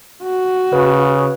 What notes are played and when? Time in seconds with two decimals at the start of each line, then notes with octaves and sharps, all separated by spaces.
0.22 F#4
0.73 C#3 B4